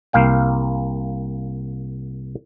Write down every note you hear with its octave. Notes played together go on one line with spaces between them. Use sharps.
C2 A#3 F5 G5